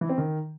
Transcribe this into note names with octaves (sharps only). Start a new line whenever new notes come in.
E3
C4
D#3